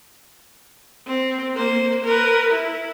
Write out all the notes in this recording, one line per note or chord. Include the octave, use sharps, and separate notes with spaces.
C4
A#3 C5
A#4 B4
E4